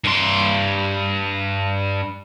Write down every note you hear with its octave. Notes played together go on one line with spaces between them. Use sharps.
G2 C6